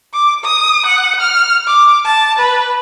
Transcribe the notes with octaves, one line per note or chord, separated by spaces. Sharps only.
D6
D#6
F#5
F6
D6
A5
B4